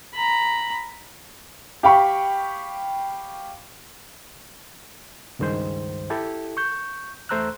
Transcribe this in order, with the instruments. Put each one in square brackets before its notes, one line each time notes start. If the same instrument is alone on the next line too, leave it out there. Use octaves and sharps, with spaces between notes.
[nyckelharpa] A#5 B5
[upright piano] G4 F5 G5 B5 C#6
[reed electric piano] C#2 G2 D#3 G#3 C5
E4 G4 A4
C#6 G6
E2 A3 C5 A#5 E6 F#6